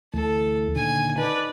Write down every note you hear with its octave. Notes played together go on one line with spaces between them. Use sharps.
D2 E3 A3 A4
A#2 D3 D#3 G#5
D#4 B4 D5 A5